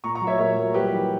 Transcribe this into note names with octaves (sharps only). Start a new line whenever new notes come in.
A#2 A#5 C#6
A#5 C#6
F#3
C#5 E5
A#2 A#4 C#5
F#3
G3 G4 B4
E3